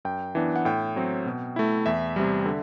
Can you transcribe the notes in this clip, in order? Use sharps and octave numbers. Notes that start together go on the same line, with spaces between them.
F#2 G5
E3 B3 D4
F#5
A2 G5
F#3 C4
B2
A3 E4
E2 E5
C3 G3
D3